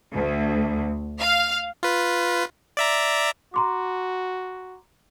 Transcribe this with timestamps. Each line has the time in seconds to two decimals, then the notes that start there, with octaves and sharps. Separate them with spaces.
0.14 D2
1.20 F5
1.83 F4 B4
2.77 D5 E5 A#5
3.54 F#4 A#5 C6 D6